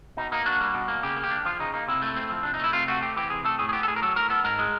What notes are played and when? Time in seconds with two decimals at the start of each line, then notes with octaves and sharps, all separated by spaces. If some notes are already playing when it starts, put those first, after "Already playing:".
0.17 B2 D#4
0.32 A#3 D#4
0.46 D4 F#4
0.61 G3
0.74 B2
0.88 A#3
1.03 C#3 G4
1.16 A#3
1.24 G4
1.31 D4
1.45 F3 F4
1.59 C#3 D#4
1.74 A#3 D#4
1.88 C3 E4
2.02 A3
2.17 C4
2.30 F3
2.43 C3 D4
2.54 D#4
2.59 A3 E4
2.73 C3 F4
2.88 A3 F#4
3.02 C4 G4
3.16 E3 G4
3.30 C3 G#4
3.44 A3 A4
3.59 A2 G#4
3.69 G#4
3.73 B3 G4
3.83 A4
3.87 A2 G#4
3.96 A#4
4.02 F#3 A4
4.16 A2 A#4
4.30 B3 A4
4.44 G#2 A#4
4.59 G#3